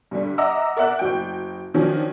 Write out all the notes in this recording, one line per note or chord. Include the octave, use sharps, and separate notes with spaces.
G2 D3 G3
D#5 E5 F#5 A#5 D6 E6
A#4 D5 E5 F#5 E6 F#6
F#1 F#3 G5
D#3 F3 F#3 C#4 D4